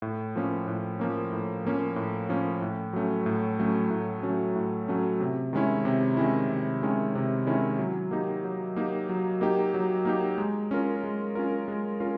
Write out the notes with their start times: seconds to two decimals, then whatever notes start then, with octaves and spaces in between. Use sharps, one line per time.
0.02 A2
0.36 F3 A#3 C#4
0.68 A2
0.99 F3 A#3 C#4
1.33 A2
1.65 F3 A#3 C#4
1.96 A2
2.29 F3 A#3 C#4
2.62 A2
2.93 F#3 A3 C#4
3.26 A2
3.59 F#3 A3 C#4
3.90 A2
4.23 F#3 A3 C#4
4.56 A2
4.88 F#3 A3 C#4
5.20 C3
5.53 D#3 G#3 C#4 E4
5.85 C3
6.17 D#3 G#3 C#4 E4
6.49 C3
6.82 D#3 G#3 C#4 E4
7.15 C3
7.46 D#3 G#3 C#4 E4
7.79 F#3
8.11 A#3 D#4 G4
8.44 F#3
8.76 A#3 D#4 G4
9.09 F#3
9.41 A#3 D#4 G4
9.74 F#3
10.05 A#3 D#4 G4
10.38 G#3
10.71 C#4 F4 A#4
11.04 G#3
11.35 C#4 F4 A#4
11.68 G#3
12.00 C#4 F4 A#4